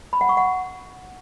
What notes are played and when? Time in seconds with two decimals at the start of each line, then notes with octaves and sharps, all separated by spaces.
0.13 B5
0.21 F#5
0.29 C#6
0.37 F#5